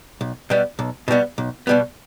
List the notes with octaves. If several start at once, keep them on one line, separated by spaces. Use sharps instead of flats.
B1
B2 G3 B3
B1
B2 G3 B3
B1
B2 G3 B3